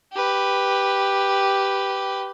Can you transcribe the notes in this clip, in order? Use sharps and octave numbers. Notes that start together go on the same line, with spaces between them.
G4 B4